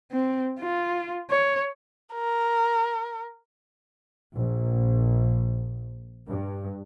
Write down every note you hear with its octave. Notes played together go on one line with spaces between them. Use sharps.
C4
F4
C#5
A#4
A#1
G2